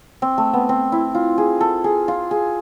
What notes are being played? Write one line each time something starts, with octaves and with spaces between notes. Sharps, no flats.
C4
A3
B3
C4
E4
F4
G#4
A4
G#4
F4
G#4